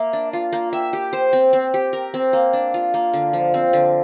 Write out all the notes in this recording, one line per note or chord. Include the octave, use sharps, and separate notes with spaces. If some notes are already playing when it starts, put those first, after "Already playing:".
Already playing: A#3 E5
D4
F4 F5
A#3
E5 G5
G4
C5
C4
C4
G4
A#4
C4
A#3 F5
D4
F4
A#3
D3
F3
C4
D3